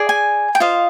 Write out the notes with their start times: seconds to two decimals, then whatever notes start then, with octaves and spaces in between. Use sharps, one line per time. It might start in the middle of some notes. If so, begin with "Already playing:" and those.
Already playing: G#4 D5
0.09 G#5
0.55 G5
0.60 F4 C5 D#5 F5